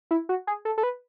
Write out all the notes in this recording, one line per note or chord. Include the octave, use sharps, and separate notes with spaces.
E4
F#4
G#4
A4
A4
B4